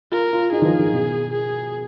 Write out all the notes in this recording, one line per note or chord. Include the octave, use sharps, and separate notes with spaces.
F4 A#4
F4
D#4 G#4
D#3
F3
D#3
B2
G#4